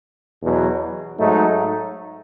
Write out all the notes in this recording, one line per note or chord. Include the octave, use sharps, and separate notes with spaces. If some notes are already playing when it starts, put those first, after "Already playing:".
E2 B2 F#3
G#2 F#3 A3 D#4